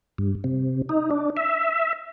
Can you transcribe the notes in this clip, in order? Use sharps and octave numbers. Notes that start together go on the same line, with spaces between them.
G2
C3
D#4
D4
E5